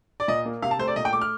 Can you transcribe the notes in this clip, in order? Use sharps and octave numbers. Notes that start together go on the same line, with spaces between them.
D5
A#2 D#5
A#3
C3 F5
A5
A3 C5
D5
A#2 D#5
G5
A3 D6
F6